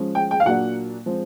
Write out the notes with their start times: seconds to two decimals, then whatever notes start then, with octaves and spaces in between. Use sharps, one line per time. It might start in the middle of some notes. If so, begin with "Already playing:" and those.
Already playing: F3 G#3 C#4
0.15 G5
0.31 G5
0.40 F5
0.45 A#2 F#3 A#3 D4 F#5
1.06 F3 G#3 C4